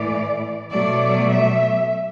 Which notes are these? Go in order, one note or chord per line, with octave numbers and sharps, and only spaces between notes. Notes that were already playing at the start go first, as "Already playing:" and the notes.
Already playing: A2 E3 A3 D5
B2 F#3 A3 D5
E5